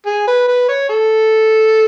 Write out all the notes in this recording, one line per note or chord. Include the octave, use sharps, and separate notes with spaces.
G#4
B4
B4
C#5
A4